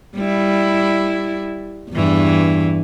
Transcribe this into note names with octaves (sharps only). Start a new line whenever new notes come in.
G3 E4
E2 G2 E3